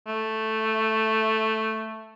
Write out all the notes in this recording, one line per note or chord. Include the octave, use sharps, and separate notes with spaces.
A3